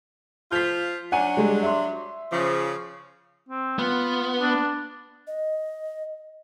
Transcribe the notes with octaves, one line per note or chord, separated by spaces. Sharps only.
F3 F4 G6 B6
F#3 D4 F#5 G#5 D#7
G3 G#3
E5 C6
C#3 F3
C4
B3 F4
D4
D#5